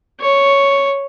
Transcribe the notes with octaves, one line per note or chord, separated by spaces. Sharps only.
C#5